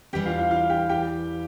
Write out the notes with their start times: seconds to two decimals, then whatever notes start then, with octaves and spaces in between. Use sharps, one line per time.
0.13 E2 E3 G3 G4 G5
0.25 F4 F5
0.38 F4 F5
0.51 F4 F5
0.70 G4 G5
0.89 G4 G5